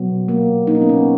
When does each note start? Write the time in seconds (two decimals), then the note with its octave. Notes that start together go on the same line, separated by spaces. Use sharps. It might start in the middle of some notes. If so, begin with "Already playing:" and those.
Already playing: B2 F#3 B3
0.28 A#3
0.67 A#3 D#4
0.75 C#4
0.82 B3
0.89 C#4